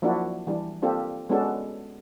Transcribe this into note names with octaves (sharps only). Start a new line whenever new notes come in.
F3 F#3 A#3 D4 E4 F#4
E3 G3 D4
A#3 C4 D4 F4 G4 A4
G#3 B3 C#4 D4 F#4 A4